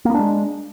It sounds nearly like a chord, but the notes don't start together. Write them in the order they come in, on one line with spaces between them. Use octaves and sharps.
A#3 B3 D4 G#3